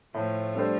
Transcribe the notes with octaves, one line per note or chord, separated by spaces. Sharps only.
A2 F3 A3
G3 D4 A4 C5